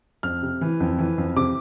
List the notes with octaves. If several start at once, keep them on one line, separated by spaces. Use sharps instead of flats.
F2 F6
C3
E3
F2
E3
F2
C3 D6